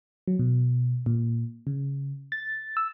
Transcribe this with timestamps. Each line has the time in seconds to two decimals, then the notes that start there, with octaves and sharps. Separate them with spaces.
0.28 F#3
0.39 B2
1.06 A#2
1.67 C#3
2.32 A6
2.77 E6